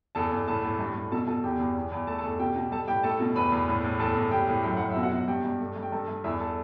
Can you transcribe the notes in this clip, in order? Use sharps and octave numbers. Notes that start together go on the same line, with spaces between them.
E2 A4 A5
E2
A2 A4 A5
A2
G2
G2
B2 A4 A5
B2 A4 A5
E2 G4 G5
E2
E2
E2
A3 A4 A5
A4 A5
E2
B2 G4 G5
B2
G3 A4 A5
A2 G4 G5
A3 A4 A5
B2
E2 B4 B5
E2
A2
A2
E2 A4 A5
E2
A2 G4 G5
A2
F#2 G5
F#2 F#5
E5
B2
F#4 F#5
B2
G2 G4 G5
G2
A3
G2
G5
G2 A4 A5
G2
E2 E4 E5
A4 A5